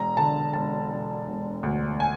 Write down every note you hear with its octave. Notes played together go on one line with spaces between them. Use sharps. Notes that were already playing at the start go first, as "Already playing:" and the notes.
Already playing: E1 A#5
D3 A5
E1 A5
E1
E1
D2
G#5